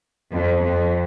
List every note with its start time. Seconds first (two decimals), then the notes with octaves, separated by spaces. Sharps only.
0.32 F2
0.62 F2